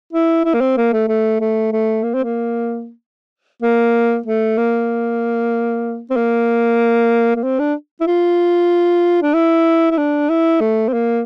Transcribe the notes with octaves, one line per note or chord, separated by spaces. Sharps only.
E4
E4
A#3
C4
A#3
A3
A3
A3
A3
A#3
C4
A#3
A#3
A3
A#3
C4
A#3
A#3
C4
D4
E4
F4
D4
E4
E4
D4
E4
A3
C4
A#3